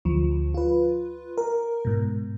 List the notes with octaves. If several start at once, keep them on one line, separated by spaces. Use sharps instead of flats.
D2 F3
F4 B4
A#4
G#2 B2